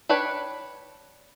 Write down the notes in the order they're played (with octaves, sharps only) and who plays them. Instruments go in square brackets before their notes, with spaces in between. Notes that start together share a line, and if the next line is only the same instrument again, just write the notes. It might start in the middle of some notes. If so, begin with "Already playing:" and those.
[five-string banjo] D4 B4 C#5 G5 B5